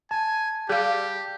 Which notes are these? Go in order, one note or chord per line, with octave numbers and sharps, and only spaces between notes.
G#5 A5
G3 G4 G#4 F5